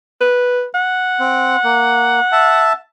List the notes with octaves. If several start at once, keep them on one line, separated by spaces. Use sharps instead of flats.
B4
F#5
C4
A#3
E5 A5